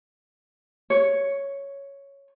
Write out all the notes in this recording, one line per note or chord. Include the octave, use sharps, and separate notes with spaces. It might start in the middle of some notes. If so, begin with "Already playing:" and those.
C#5